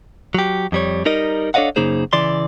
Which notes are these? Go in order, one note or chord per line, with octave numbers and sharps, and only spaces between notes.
F#3 G4
F2 G3 C#5
G3 D#4 A#4 D#5
D4 A4 C#5 D#5 F5 F#5
F#2 C#3 A#3 D#4 G#4 C5
C#3 E3 D5 C6